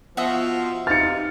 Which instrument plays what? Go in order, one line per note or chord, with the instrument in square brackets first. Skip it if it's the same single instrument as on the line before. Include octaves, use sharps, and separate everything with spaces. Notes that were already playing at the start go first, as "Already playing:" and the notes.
[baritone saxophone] F3 [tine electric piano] B3 [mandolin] F#4 D#5 E5
[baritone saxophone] C3 [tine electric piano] D#4 F5 F6 [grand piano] A6 C#7